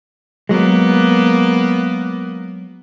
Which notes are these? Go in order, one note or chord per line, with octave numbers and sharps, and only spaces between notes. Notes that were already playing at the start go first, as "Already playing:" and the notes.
F#3 G#3 A#3 B3